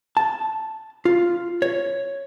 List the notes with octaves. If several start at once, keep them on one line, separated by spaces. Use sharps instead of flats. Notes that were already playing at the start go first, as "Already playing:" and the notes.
A5
F4
C#5